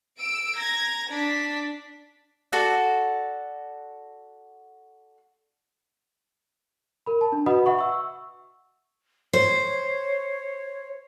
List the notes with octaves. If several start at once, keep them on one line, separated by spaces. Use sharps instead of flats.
E6 D7
A#5 G#6 A#6
D4 B6
F#4 A4 D5 F#5
A#4 B5
A5
D4
F#4 B4 D#5 F#5 B5 D#6
E5 F#5 C#6
C#6 E6
C5 C#5